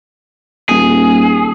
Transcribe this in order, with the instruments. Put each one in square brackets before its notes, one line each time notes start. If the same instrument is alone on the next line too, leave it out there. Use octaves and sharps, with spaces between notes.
[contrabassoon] D#1 [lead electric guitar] G#4